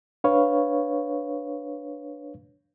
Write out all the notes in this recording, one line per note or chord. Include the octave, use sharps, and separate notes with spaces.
D4 B4 C#5 F5